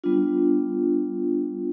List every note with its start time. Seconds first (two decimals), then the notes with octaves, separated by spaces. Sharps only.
0.04 G3 B3 D4 F4